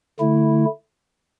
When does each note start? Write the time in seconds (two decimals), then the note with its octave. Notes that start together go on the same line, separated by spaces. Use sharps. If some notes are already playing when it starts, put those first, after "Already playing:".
0.20 D3 A3 E4